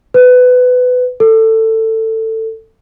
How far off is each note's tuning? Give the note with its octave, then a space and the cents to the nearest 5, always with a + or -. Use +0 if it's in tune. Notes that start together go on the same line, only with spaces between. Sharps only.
B4 +20
A4 +20